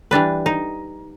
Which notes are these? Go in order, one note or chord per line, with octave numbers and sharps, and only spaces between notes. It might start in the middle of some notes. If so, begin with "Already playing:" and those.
E3 G3 D4 B4
D#4